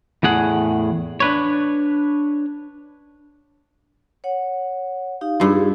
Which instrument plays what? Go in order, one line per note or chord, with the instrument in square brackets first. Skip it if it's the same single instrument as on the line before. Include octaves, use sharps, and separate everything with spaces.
[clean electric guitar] E2 A2 G#4 F#5
D4 B4 C#5
[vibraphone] C#5 F#5
D#4 G4 F5
[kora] G2 F4 [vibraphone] D#4 G#4